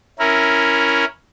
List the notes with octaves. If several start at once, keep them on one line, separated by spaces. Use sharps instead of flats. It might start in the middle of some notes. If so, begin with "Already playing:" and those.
C#4 E4 A#4